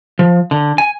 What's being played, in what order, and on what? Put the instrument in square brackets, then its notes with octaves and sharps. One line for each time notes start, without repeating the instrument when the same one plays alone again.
[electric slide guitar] F3
D3
G#5